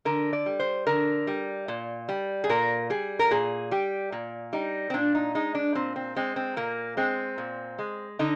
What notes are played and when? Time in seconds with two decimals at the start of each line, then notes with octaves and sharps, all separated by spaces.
0.05 D3 A#4
0.33 D5
0.46 G3
0.60 C5
0.87 D3 A#4
1.27 G3
1.68 A#2
2.09 G3
2.44 G#4
2.49 A#2 A#4
2.90 G3 G#4
3.19 A#4
3.31 A#2 G#4
3.71 G3 G4
4.12 A#2
4.53 G3 D#4
4.90 C4
4.94 A#2 D4
5.15 D#4
5.35 G#3 D#4
5.55 D4
5.75 A#2 C4
5.96 C4
6.16 G#3 C4
6.36 C4
6.56 A#2 A#3
6.97 G#3 C4
7.38 A#2
7.79 G#3
8.19 D3 D#4